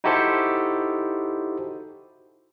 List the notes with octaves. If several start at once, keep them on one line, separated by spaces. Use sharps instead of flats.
D#4 E4 F#4 G4 A4 C5